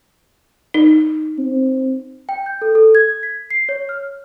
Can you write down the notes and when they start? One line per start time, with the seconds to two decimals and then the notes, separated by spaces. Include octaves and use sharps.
0.74 D#4
1.38 C4
2.29 G5
2.46 G6
2.62 A4
2.75 A4
2.95 G#6
3.23 B6
3.50 C7
3.69 C#5
3.89 F6